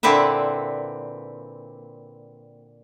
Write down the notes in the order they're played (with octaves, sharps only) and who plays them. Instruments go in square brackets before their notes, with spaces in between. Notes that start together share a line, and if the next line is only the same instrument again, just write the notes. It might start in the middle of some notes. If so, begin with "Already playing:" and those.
[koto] A#2 D3 C4 E4 B4 E5